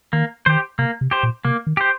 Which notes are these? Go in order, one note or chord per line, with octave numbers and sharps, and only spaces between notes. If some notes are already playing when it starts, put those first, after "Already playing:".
D#3 A#3
D#3 G4 C5
C3 A#3
C3
G4 C5
A#2
C3 A#3
D#3
G4 C5